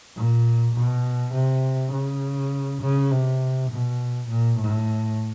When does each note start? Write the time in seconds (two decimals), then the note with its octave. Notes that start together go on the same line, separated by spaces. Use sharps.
0.16 A#2
0.75 B2
1.34 C3
1.93 C#3
2.82 C#3
3.11 C3
3.71 B2
4.29 A#2
4.59 A2